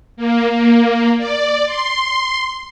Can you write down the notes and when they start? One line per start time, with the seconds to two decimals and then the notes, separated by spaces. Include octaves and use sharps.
0.17 A#3
0.50 A#3
1.18 D5
1.66 C6